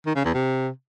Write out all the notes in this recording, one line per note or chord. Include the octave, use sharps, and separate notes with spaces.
D#3
C#3
E2
C3